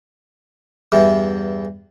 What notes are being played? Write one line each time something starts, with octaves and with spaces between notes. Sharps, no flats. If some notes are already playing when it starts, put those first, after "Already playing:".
E2 G2 E3